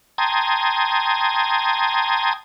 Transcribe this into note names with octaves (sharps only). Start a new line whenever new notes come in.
G5 A5 A#5 C6 D#6 G#6